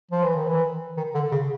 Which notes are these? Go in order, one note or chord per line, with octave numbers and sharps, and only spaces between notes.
F3
E3
D#3
E3
D#3
D3
C#3